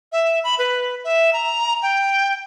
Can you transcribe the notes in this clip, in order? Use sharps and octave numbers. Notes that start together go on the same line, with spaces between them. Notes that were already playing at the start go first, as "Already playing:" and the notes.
E5
B5
B4
E5
A#5
G5